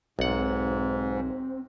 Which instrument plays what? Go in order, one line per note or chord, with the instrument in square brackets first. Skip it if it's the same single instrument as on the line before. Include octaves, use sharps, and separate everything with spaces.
[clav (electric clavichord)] B1 F#5 [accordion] G#2 [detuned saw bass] C4